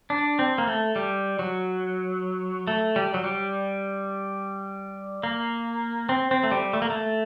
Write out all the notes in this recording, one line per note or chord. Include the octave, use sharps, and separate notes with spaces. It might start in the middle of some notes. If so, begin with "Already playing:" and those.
D4
C4
A#3
A3
G3
F#3
A3
G3
F#3
G3
A#3
C4
C4
A3
G3
A3
A#3
A3